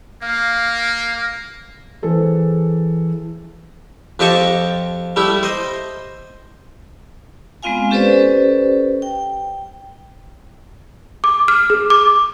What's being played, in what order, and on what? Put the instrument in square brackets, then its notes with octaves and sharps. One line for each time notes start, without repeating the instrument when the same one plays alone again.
[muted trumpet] A#3 [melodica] F5
[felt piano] E3 G#4 A4 C5
[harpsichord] F2 C4 G4 D#5 A5 C#6
G3 A3 E4
C5 D#5
[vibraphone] G#3 B3 C4 F4 F5 G#5
C#4 G4 A4 B4 C5 D5
G5
[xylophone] D6
F6
G#4
D6